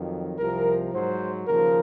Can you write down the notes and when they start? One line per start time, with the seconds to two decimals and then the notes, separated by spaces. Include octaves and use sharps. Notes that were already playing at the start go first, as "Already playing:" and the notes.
Already playing: F2 D#3 F#3
0.39 C2 C3 F3 A#4
0.93 G#2 F#3 C5
1.47 D#2 C#3 F3 A#4